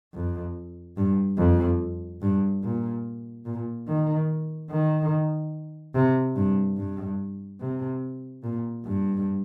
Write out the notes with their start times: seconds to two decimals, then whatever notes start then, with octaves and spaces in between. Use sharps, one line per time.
0.14 F2
0.97 G2
1.38 F2
2.22 G2
2.63 A#2
3.46 A#2
3.88 D#3
4.70 D#3
5.95 C3
6.36 G2
6.78 G2
7.60 C3
8.43 A#2
8.85 G2